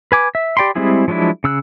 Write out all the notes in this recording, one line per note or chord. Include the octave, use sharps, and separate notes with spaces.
B4 G#5 D6
E5
G4 D5 G5 B5 C6
G3 G#3 C4 E4 G#4
F3 F#3 G#3 D4 E4
C#3 E6 F#6